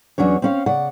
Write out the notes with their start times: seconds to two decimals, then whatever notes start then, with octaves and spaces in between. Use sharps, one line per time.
0.18 E2 F#3 C#4 D4 C#5
0.42 C4 C#4 F5
0.66 C#3 D5 F#5